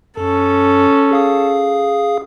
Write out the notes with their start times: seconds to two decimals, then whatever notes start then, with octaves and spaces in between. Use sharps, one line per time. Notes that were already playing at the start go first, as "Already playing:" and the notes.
0.17 F#2 C#4 A4
1.11 G#4 F5 D#6